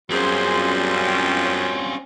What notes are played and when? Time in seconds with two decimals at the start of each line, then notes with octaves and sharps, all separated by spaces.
0.11 F#2 F#3 G3 C4 C#4 F4 G#4 C5
1.01 C#5 G5